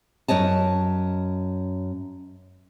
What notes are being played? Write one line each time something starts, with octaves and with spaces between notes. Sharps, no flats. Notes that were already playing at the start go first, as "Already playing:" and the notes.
F#2 C#5 D#5 A5